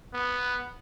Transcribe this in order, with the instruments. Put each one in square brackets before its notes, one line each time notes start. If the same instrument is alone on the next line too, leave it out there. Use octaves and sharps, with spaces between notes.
[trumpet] B3